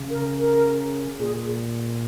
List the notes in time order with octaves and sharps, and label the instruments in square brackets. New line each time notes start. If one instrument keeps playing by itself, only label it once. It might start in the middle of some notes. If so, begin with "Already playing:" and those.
Already playing: [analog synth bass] C#3
[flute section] A#4
A#4
[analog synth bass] A#2 [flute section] G#4